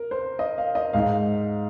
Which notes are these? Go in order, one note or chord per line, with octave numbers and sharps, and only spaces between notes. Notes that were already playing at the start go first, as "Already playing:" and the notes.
Already playing: A#4
C5
D#5
F5
D#5
G#2 G#3 D#4 F5